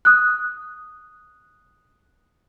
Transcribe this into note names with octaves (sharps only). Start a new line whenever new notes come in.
D#6 F#6